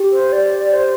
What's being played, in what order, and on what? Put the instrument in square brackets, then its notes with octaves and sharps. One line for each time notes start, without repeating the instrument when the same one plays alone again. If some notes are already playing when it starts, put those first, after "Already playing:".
Already playing: [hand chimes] G4
[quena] C5
D5
C5